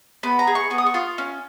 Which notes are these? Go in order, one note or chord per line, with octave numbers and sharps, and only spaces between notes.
B3 B5
A#5
G#4
C#6
B3 C#6
D#6
C#6
F4
C#4